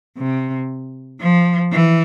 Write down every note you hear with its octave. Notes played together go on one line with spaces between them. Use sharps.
C3
F3
E3